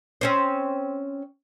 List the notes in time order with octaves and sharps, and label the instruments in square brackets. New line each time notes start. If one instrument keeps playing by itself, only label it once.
[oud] C4 C#4 C5